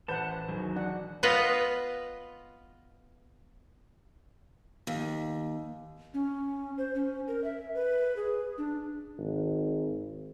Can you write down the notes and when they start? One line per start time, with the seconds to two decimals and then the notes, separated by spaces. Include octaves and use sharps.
0.08 A1 A4 B4 C5 F#5 A5 G6
0.48 E1 D#3 F#3 G#4
0.76 D4 F#5
1.23 B3 F4 B4 D#5
4.87 D#2
6.14 C#4
6.78 C5
6.95 C#4
7.28 A#4
7.44 E5
7.75 B4
8.17 G#4
8.58 D4
9.18 G#1